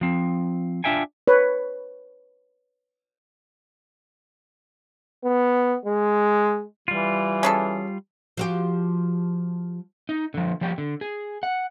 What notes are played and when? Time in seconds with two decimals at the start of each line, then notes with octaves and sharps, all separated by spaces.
0.01 F3 C4
0.84 D4 F4 E5 G5 G#5
1.28 B4 C#5
5.24 B3
5.85 G#3
6.88 E3 G3 F4
7.43 C#4 G#4 A4
8.37 F3 F#4 G4
10.09 D#4
10.34 D3 F3
10.61 F3 G3 G4
10.78 D3
11.01 G#4
11.43 F#5